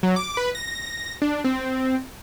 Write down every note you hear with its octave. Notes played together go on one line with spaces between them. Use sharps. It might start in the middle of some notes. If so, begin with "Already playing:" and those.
F#3
D6
B4
A#6
D4
C4